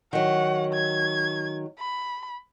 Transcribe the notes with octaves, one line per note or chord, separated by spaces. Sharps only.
D#3 F#3 F#5
G#6
B5